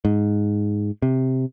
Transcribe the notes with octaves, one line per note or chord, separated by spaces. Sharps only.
G#2
C3